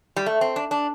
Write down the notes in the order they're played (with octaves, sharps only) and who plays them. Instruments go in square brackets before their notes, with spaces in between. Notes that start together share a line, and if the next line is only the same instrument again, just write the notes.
[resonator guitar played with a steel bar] G3
A3
C4
D4
D4